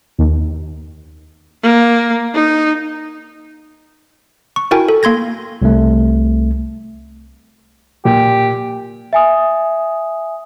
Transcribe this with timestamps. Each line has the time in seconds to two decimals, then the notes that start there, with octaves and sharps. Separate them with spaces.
0.19 D#2
1.63 A#3
2.34 D#4
4.56 C#6
4.71 E4 F#4 A#4 G5 G#5
4.89 A4
5.03 A#3 C6 G#6 A#6
5.62 C2 A3
8.05 A#2 G4
9.13 E5 G#5 D#6